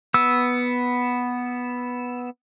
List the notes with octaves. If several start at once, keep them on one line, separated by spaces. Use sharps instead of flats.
B3 E6